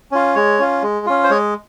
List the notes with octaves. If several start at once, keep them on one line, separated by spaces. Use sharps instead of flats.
C#4 F4
G#3 C#5
C#4 F4
G#3
C#4 F4
C5
G#3 C#5